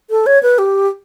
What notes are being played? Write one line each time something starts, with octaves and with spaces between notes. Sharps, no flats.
A4
C#5
B4
G4